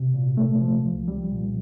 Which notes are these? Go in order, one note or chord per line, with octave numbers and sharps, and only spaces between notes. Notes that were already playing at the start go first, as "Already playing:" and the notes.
Already playing: C3
A#2
A3
F3
C2
G3
A#2